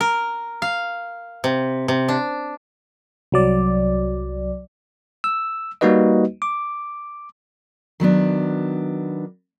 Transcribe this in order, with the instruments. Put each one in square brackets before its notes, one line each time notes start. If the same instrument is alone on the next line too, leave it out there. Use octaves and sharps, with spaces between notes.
[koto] A#4
F5
C3
C3
D4
[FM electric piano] C2 F#3 D5
[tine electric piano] E6
G3 A#3 D#4 F#4 B4 D#5
D6
[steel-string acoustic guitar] D#3 F#3 B3 D4